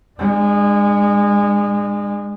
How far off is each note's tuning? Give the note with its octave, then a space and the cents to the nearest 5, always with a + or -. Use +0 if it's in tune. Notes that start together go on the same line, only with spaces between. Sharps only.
G#3 -25 D4 +35